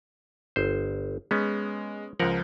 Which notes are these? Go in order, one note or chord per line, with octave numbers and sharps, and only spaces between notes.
G1 C5
G#3 B3 C#4
C#2 F3 A#4 F#5